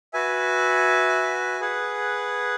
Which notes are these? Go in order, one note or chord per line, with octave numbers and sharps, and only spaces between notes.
F#4 B4 E5 G#5
G#4 B4 F#5